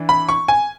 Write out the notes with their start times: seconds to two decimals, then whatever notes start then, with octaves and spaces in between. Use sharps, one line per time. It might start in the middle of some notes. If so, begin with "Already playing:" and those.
Already playing: E3 D4
0.09 B5
0.29 C#6
0.48 G#5